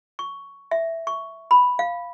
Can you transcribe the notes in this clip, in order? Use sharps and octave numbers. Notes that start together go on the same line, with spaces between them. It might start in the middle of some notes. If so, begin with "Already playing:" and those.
C#6
E5
C#6
B5
F5